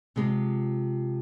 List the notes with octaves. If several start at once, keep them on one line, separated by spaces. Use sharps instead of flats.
C3 F3 G#3